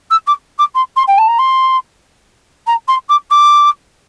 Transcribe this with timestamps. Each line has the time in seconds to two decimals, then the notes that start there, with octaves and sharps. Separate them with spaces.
0.10 E6
0.27 D6
0.58 D6
0.75 C6
0.96 C6
1.07 G5
1.18 A5
1.27 A#5
1.38 C6
2.67 A#5
2.88 C6
3.09 D6
3.30 D6